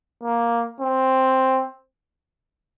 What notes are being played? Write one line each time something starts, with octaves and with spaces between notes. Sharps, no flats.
A#3
C4